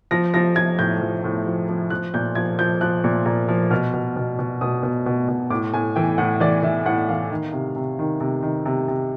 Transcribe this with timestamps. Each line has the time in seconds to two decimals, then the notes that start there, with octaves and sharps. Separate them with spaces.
0.11 F3 A#6
0.34 F3 A#6
0.56 F3 G#6
0.79 A2 G6
1.01 F3
1.24 A2
1.46 F3
1.69 F3
1.90 F3 F#6
2.14 A#2 G6
2.35 F3 G#6
2.59 F3 G6
2.81 F3 F#6
3.04 A#2
3.26 A#2
3.48 F3
3.70 B2 F6
3.94 B2
4.17 B2
4.39 B2
4.61 B2 D#6
4.83 B2
5.06 B2
5.28 B2
5.50 A2 D6
5.74 A2 G#5
5.96 E3 G5
6.18 A2 F#5
6.40 E3 D5
6.63 E3 E5
6.85 A2 F#5
7.09 E3 F5
7.30 D#3
7.53 C3
7.76 C3
7.99 D#3
8.21 C3
8.43 D#3
8.66 C3
8.88 C3